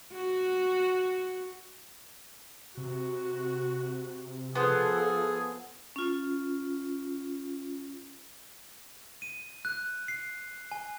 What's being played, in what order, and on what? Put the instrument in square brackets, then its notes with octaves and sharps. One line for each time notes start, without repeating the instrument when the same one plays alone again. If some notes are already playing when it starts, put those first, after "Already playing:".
[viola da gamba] F#4
[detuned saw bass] C3 [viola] F#4
[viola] F3 A4 [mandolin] B3 C5 [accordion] G#4
[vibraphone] C#4 F4
[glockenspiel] D#7
F#6
C7
G#5